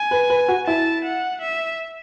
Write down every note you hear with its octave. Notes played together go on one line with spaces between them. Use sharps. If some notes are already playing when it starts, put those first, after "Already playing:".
Already playing: G#5
B4
B4
F#4
E4 A5
F#5
E5